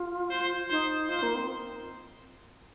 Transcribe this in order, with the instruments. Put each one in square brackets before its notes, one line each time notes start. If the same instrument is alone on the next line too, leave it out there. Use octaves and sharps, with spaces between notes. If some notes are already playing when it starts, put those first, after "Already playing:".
Already playing: [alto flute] F4
[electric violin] C5
[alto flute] D#4 [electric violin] C5
[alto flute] F4 [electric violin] C5
[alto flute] A#3
C4